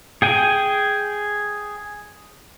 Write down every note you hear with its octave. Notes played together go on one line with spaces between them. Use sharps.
G#4 G5 G#5